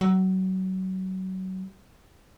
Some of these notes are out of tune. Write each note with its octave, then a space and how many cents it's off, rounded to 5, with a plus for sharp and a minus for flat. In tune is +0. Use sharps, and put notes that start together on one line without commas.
F#3 +25